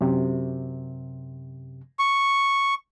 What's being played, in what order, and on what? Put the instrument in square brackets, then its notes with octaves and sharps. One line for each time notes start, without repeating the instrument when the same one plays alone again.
[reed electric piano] F#2 C3
[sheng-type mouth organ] C#6